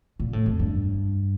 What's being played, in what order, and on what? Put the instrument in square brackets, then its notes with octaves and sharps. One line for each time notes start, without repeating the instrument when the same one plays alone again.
[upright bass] A#2
A2
F2
G2